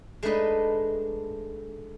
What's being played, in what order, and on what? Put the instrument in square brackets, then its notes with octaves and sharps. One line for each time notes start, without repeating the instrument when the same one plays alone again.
[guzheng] G#3 A3 D4 D#4 B4 D#5